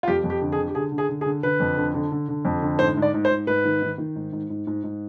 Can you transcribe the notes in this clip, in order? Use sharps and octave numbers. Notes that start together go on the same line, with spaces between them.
F4
F2 G4
F2
G4
D3
G#4
D3
G4
D3 G#4
D3
G#4
D3
G#4
D3
D3 B4
F2
D3
D3
D3
D3
F2
D3
G#2 C5
G#2
D5
G#2
C5
G#2
G#2 B4
D#3
D#3
D#3
G#2
G#2
G#2
G#2
G#2